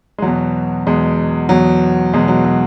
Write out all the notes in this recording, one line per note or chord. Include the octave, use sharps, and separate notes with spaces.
G#3
E2 B2 F#3
E2 B2 G#3
E2 B2 F#3
E2 B2 G#3
F#3
F#3